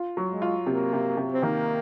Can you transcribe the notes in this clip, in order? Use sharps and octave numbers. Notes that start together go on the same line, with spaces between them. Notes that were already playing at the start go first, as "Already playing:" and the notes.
Already playing: F4
F#3
G#3
F4
C3 A#3
C3
C3
C4
D#3 A#3